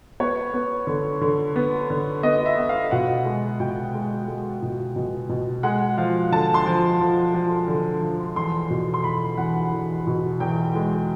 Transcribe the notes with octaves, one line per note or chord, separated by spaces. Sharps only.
B3 C#5
B3
D3
D3
B3
D3
B3 D#5
E5
B3
F5
B2 F#5
G#3
B2 G5
G#3
G#3
B2
B2
B2
G#3 F#5
F3 F5
D3 A5
C6
F3
F3
F3
D3
F3
E2 C6
B2
C6
E2 B5
E2 F#5
E2
B2
E2 G5
G#3